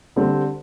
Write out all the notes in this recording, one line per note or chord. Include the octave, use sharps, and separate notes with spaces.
D3 G3 C4